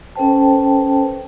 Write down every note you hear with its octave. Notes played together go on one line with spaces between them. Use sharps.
C#4 A4 B4 C5 G5 A5